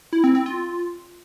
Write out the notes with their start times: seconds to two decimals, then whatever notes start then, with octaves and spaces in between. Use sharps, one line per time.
0.13 E4
0.24 C4
0.35 C4
0.46 F4